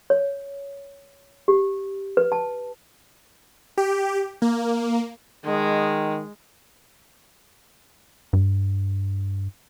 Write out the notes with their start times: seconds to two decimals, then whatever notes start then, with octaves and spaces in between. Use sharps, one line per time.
0.10 C#5
1.48 G4
2.17 B4
2.32 A5
3.78 G4
4.42 A#3
5.45 D#3 G#3
8.33 G2